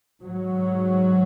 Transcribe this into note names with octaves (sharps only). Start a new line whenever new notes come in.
G#2 F#3